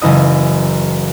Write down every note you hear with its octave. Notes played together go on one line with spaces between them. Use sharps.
F#1 E3 E4 D#5 D#6